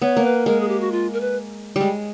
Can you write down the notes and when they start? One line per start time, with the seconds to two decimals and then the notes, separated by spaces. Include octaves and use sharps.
0.02 B3 C#5
0.17 A#3
0.24 B4
0.46 G#3 A#4
0.60 G#4
0.68 G4
0.80 F#4
0.92 F4
1.13 A#4
1.21 B4
1.76 G3 G#3